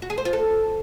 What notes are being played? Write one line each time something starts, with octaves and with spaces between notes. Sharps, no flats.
F#4
G#4
C5
F4
A4